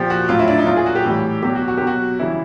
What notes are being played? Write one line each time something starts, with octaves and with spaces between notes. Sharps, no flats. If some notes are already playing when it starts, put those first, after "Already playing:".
Already playing: A#2 F3 G4
F#4
A2 F#3 F4
E4
D4
D#4
A#2 F#3 F4
G#4
F#4
G4
A2 E3 G3
B2 F#3 G4
F#4
F#4
B2 F#3 G4
F#4
C#3 E3 G3 E4